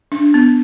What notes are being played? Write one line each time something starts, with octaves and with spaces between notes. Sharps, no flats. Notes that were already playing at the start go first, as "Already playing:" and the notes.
D4
B3